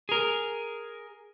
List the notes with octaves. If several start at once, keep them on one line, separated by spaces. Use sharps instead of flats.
G#4 A#4